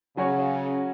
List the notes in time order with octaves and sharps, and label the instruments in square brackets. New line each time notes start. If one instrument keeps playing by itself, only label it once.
[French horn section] C#3 [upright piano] F#3 C#4 F#4 C#5